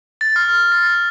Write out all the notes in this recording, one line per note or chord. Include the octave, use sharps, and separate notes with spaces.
A6
F6
A6